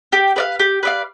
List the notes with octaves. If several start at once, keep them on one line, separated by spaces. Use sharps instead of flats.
G4
B4 D5 F5
G4
B4 D5 F5